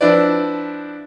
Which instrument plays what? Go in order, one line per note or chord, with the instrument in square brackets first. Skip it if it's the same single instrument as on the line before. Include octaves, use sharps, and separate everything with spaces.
[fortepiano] F3 C4 D4 E4 B4 D5